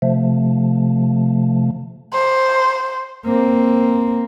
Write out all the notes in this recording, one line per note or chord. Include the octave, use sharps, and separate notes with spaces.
C3 F3 A3
C5
A#3 C4